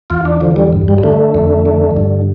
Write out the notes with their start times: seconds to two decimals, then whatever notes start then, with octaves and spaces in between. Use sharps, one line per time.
0.10 E2 F4
0.25 D4
0.40 D3 F3
0.56 G3
0.73 G2
0.88 G3
0.98 G3
1.03 D3 A3
1.34 F2
1.65 D3
1.96 G2